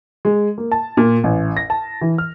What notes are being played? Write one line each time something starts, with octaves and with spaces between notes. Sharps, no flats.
G#3
A#3
A5
A#2
A1
A#6
A5
E3
F6